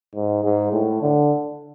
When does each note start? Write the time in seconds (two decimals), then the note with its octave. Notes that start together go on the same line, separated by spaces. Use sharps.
0.15 G#2
0.44 G#2
0.72 A2
1.02 D3